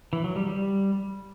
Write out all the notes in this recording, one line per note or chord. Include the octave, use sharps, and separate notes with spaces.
E3
F#3
G3
G3